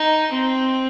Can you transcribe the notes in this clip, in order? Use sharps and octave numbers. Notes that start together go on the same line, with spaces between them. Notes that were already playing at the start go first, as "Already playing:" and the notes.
Already playing: D#4
C4